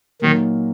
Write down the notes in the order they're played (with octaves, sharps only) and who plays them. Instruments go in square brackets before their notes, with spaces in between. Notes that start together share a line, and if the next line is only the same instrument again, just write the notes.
[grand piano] A#2 F#3 A#3 D#4 [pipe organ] D#3